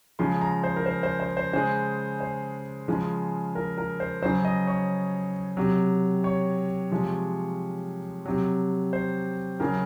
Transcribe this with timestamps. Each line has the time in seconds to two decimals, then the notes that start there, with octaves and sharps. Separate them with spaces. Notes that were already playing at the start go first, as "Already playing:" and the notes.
0.19 C#3 F3 G#3 C6
0.41 A#5
0.64 C5
0.76 A#4
0.86 C5
1.03 C5
1.20 C5
1.37 C5
1.53 C#3 G#3 C5
2.21 C5
2.88 C#3 F3 G#3
3.55 A#4
3.78 A#4
4.00 C5
4.22 F#3 C5
4.26 C#3
4.45 D#5
4.67 C#5
5.57 C3 F#3
6.24 C#5
6.91 C3 F3 G#3
8.26 C3 F#3
8.93 C5
9.60 C#3 F#3 A#4